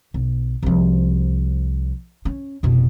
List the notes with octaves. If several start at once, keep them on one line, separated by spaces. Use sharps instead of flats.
B1
C2 F3
C#4
F1 B2